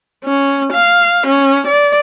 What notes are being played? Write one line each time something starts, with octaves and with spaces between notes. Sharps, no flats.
C#4
F5
C#4
D5